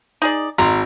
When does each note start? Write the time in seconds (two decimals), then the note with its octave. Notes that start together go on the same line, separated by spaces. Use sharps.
0.22 D#4 G#4 D5
0.58 G#1 A#5 C6